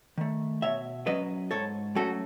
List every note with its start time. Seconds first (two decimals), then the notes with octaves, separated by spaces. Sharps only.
0.18 D#3 A3
0.62 B2 C#5 E5
1.07 F#3 C#4 B4 D#5
1.51 G#2 A4 C#5
1.95 F#3 A3 C#4 F#4 A4